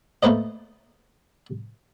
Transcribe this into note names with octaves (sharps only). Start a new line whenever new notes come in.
A3 A#3 B4 C5 D#5